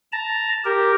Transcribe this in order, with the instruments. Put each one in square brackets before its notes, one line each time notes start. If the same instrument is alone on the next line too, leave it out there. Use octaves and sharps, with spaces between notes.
[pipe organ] A5 A#5
G4 A#4